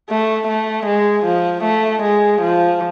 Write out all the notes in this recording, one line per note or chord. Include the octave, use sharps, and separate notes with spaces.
A3
A3
G#3
F3
A3
G#3
F3